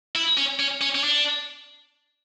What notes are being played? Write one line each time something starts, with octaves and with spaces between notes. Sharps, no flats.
E4
C#4
C#4
C#4
C#4
D4